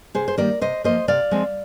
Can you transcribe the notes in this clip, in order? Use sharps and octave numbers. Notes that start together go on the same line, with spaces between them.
C3 G#4 C5
C5
D#3 G3 A#3 A#4 D5
C3 C5 D#5
F3 A#3 C5 D#5
C3 D5 F5
F3 G#3 C4